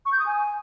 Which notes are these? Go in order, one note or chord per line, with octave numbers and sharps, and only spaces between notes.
C#6
G6
D#6
G#5